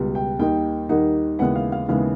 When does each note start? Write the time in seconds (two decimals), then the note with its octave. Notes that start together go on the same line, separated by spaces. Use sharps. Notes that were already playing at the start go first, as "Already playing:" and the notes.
Already playing: C#2 B2 G3
0.15 G5
0.39 D#2 D#3 G3 A#3 D#4 G5
0.89 D#2 D#3 G3 A#3 D#4 F#5
1.39 D#2 C#3 E3 G#3 B3 F#5
1.55 F5
1.72 F5
1.88 D#2 C#3 E3 G#3 B3 F5